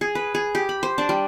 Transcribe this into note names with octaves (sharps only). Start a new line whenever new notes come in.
G#4
B4
G#4
G4
B5
C5
D4
G3